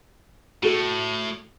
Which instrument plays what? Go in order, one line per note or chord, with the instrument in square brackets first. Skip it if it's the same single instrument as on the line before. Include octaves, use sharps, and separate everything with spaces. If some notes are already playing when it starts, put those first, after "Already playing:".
[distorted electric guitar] A2 [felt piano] F#4 A4